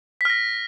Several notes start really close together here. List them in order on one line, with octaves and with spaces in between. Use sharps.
B6 F6 A#6